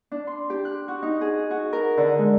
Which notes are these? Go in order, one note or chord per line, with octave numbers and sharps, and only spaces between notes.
D4
C6
G4
F#6
F#4
D#4
G#4
F#4
A#4
D3
G#3